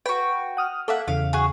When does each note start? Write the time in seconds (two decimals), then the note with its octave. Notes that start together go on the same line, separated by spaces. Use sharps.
0.06 F#4 B4 G5
0.57 F#5 D#6 F6
0.88 A#3 A4 E5 F#5
1.08 E2 C#3 F5
1.33 F#4 G#4